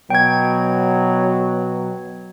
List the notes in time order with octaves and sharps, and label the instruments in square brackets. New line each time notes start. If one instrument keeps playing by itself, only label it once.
[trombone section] B2 F#3 [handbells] G5 G#6